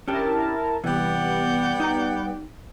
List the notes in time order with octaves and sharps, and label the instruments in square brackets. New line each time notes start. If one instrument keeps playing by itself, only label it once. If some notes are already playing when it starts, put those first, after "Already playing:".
[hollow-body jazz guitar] C#4 D4 G4 [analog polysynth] E4 A#4 A5
[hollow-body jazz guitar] C3 E3 [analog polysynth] G3 B3 [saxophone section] G4 D5 F#5
[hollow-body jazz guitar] D#4 A#5